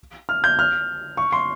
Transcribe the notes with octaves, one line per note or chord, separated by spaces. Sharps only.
F6
G6
F6
C#6
C6